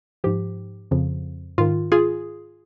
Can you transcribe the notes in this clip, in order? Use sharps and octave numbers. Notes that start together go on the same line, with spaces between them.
G#2 F3 G4
F2 C#3 F3
G#2 D#3 F4
F4 G#4